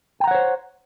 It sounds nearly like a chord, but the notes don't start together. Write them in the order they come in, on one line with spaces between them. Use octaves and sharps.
G5 A#5 F#5 C#5 C5